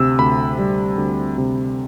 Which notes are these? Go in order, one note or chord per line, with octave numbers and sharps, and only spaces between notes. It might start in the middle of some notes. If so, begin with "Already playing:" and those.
Already playing: D2 C3 E6
D2 B5
G3
D2
C3